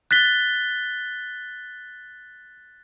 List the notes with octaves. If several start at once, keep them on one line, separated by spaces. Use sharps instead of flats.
F#6 A6 B6 G7